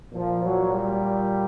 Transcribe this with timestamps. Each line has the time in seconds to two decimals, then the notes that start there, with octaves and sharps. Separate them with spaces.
0.14 A#2 F3
0.43 F#3
0.73 G3